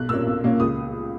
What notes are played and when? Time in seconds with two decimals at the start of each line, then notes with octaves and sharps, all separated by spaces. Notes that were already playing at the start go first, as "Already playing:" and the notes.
Already playing: B1 F#6
0.09 A#2 A#3 C#4 E6
0.27 B1
0.43 A#2 A#3 C#4
0.60 C#2 D#6